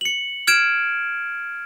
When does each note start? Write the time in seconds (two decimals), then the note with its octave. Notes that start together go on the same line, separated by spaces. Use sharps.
0.01 C#7 F#7
0.47 F6 G#6 D7 E7